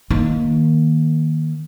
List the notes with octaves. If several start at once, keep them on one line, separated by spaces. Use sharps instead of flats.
D#3 A#3